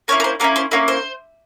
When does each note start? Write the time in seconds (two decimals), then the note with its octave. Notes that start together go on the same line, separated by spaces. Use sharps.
0.08 A#3 C#4 E4 C#5
0.20 A#4
0.24 C5
0.40 A#3 C#4 E4 A#4
0.56 C5
0.71 A#3 C#4 E4 A#4
0.88 C5